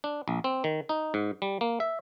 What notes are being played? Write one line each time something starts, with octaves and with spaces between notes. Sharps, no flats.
D4
A#1
C4
D#3
D#4
G#2
G3
A#3
E5